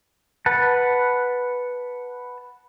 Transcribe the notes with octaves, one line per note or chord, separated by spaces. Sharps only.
B4 F#5 A5